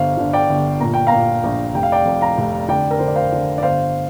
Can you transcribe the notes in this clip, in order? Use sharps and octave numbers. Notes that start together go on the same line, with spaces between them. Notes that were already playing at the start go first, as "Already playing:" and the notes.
Already playing: G1 C5 F5
D3
D5 G5
G1
A#2 A#5
G5
A#2 F5 A#5
A#1
F1 G5
F5
D5 G5
F2
F5 A#5
F1
D3 D5 G5
A#4
D3 C5
D5
C5 F5
D3
D5
G1 C5 F5